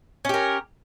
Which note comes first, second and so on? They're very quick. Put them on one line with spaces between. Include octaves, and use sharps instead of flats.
C#4 G4 A#4